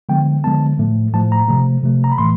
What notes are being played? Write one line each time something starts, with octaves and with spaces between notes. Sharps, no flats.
D3 F3 G#3 B3 G5
D3 F3 G#3 B3 A5
A2 F3 A3
A2 F3 A3 A5
A#5
C3 F3 A3
C3 F3 A3
A#5
B5
A2 E3 A3 C6